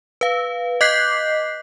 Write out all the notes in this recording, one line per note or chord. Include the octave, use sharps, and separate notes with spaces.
B4 F5
D#5 D6 F#6 G6 B6 C7